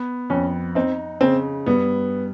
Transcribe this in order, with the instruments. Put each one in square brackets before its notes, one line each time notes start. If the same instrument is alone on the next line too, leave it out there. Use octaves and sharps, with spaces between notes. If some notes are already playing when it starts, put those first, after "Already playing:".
Already playing: [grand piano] B3
[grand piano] F2 [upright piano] C#4
[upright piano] C4 [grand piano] D#4
[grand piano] C#3 [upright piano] C4
[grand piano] G2 [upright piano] B3